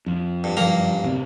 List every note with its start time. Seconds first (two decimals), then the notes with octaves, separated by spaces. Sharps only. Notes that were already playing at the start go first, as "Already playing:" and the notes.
0.06 F2
0.44 G2
0.57 F#1 G2 F3 G3 A#3 A#5
1.04 D1 C3 C4